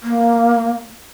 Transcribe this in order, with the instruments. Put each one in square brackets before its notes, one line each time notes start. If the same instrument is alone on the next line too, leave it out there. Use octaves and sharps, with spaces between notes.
[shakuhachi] A#3